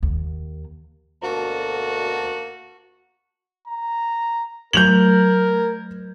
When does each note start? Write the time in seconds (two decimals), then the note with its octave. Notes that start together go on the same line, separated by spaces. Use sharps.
0.03 D#2
1.23 D2 B2 A#3 F#4 A5
3.67 A#5
4.73 F#3 A3 A#4 G6 G#6 F7 F#7